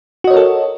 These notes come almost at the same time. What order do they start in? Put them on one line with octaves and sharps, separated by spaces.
F#4 D#5 C#5 A#4 A4